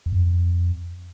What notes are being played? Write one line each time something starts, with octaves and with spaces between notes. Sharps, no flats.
E2
F#2
F2